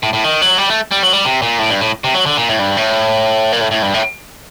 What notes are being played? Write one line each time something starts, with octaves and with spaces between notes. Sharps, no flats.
A2
A2
D#3
F#3
G3
A3
G3
F#3
G3
C3
A#2
A2
G2
A2
C3
F#3
D3
A#2
A2
G2
A2
A#2
A2
A2
G2
A2